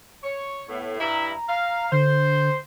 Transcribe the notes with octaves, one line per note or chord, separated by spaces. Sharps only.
C#5
A2 B3
G2 E4 A#5
F5
D3 C5